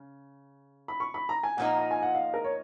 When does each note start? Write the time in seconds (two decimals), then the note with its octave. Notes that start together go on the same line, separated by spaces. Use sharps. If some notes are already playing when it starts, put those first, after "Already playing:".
Already playing: C#3
0.88 B5
1.00 C#6
1.14 B5
1.29 A#5
1.43 G#5
1.57 A#2 F3 A#3 D#4 F#5
1.78 A#5
1.91 G#5
2.03 F#5
2.15 F5
2.34 A#4
2.44 C#5